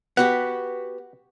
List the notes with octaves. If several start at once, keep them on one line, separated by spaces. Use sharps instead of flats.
B3 F#4 G4 F#5